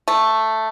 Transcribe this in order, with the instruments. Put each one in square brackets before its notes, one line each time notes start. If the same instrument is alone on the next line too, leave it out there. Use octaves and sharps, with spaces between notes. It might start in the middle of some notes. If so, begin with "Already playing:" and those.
[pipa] A3